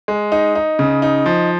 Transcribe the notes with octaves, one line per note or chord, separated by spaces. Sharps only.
G#3
D#4
D#4
C#3
D#4
F3